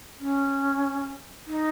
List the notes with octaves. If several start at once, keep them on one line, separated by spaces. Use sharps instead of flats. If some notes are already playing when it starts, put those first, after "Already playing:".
C#4
D#4